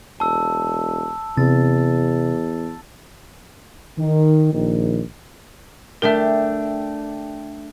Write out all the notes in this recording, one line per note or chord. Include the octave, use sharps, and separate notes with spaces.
E1 A5 E6
E2 C3 A6
D#3
A#1 D#3
A3 D4 G4 A#4 E5